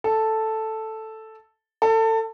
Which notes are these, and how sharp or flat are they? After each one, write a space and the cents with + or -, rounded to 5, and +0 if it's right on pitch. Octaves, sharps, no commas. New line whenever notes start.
A4 +0
A4 +25